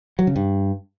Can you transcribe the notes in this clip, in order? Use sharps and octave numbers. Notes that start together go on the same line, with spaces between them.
F#3
C#3
G2